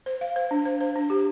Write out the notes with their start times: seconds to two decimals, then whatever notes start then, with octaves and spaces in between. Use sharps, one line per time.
0.06 C5
0.21 F5
0.36 C5
0.51 D4
0.65 C5
0.81 C5
0.96 D4
1.10 G4